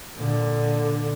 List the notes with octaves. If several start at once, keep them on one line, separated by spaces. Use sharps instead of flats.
A#2 D3